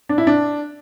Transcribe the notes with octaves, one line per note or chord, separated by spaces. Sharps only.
D4
E4
D4